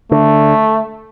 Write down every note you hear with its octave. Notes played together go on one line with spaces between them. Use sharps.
D3 A3